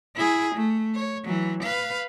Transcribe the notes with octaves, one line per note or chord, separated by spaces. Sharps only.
E4 G#4
A3
C#5
E3 F#3
B4 F5